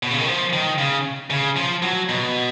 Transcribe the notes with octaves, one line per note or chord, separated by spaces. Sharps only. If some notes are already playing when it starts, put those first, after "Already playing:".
B2
C#3
D#3
F3
D#3
C#3
C#3
F3
F#3
B2